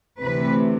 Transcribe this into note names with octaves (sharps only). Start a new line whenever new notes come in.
D2 C3 E3 A3 B4